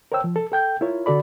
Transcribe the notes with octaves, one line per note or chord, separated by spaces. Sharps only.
A#4 C5 C#5 G5 E6
F3
A4
A4 G5 G6
E4 F4 A#4 C#5
D3 F#4 A4 D5 B5